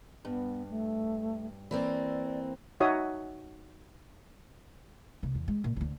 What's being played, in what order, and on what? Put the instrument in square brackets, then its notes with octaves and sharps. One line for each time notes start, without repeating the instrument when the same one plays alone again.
[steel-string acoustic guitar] G2 [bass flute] B3
[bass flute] A3
[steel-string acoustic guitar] E3 A#3 C4 [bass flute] D5
[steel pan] D#4 F#4 C#5 E5 D#6
[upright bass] C2 D4
E2
G#3
A#2
D2 D3